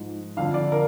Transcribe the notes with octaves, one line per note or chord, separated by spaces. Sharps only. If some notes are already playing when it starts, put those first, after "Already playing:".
Already playing: G#2 F3
F2 D3 F3 F5
D5
A#4